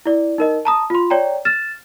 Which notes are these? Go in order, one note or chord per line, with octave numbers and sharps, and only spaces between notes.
E4 D5
D#4 A#4 D#5
A5 A#5 D#6
F4 C6
C#5 D5 G5 A#5
F6 A6 E7